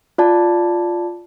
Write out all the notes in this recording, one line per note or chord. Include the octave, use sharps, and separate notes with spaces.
F4 D5 A5